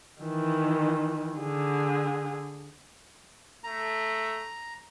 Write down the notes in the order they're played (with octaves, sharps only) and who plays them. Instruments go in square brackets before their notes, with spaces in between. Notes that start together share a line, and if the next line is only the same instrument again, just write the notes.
[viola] D#3 E3
D3 G#4
[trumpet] A3 [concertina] A#5